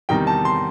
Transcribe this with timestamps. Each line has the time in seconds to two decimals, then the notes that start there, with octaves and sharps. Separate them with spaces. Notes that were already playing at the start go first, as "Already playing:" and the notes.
0.09 E2 C3 D#3 G3 D#4 G5
0.27 A5
0.45 C6